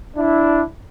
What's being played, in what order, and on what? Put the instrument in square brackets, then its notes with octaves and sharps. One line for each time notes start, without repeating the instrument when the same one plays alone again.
[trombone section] D4 E4